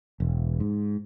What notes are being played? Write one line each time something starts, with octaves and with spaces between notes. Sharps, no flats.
E1
G#2